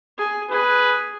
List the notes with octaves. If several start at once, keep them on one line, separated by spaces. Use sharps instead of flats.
G#4
G#4 B4